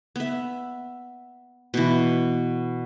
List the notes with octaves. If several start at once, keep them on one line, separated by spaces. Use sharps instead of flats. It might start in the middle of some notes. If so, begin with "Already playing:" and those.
B3 E5
B2 E3